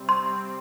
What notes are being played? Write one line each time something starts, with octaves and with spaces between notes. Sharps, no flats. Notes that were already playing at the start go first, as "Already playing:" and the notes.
Already playing: C3 G3 C4
C6